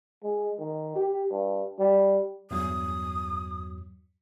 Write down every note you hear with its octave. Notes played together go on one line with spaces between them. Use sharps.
G#3
D#3
G4
G2
G3
E2 G2 F#3 D#6